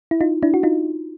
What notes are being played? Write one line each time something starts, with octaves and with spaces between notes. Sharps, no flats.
E4
D#4 F4
D4 E4
F#4
D#4 F4